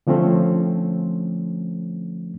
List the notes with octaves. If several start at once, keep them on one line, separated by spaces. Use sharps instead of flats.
D3 F3 A3 C4 C#4